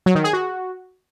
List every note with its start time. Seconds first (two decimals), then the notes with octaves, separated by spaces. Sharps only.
0.06 F#3
0.15 D#3
0.24 G#4
0.33 F#4